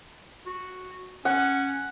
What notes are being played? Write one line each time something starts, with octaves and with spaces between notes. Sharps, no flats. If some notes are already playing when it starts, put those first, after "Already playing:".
F#4
C#4 F#5